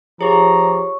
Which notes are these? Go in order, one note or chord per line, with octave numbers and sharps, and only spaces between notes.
F3 G4 G#4 C#5 A#5 C#6